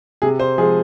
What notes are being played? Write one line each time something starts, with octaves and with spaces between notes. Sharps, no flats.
C3 G#4
C5
F3 G#3 G#4